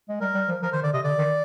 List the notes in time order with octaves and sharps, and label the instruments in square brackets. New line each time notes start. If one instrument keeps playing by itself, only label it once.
[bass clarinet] G#3
[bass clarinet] G3 [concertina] A#4
[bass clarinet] G3
F3
[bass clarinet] F3 [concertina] A#4
[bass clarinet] D#3 [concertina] C5
[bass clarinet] D3 [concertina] D5
[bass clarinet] C3 [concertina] D#5
[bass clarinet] D3 [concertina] D5
[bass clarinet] D#3